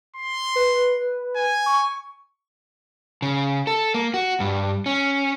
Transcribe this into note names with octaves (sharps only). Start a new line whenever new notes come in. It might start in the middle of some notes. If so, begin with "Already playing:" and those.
C6
B4
G#5
C#6
C#3
A4
A#3
F#4
G2
C#4